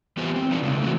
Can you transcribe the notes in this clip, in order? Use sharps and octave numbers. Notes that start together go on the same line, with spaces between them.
E3 B3 F4 G4 C5 G#5
C4
F3 F#3 G#3 B3 D4 D#4
C#3 G#3 A3
E3 A3 C4 E4 F#4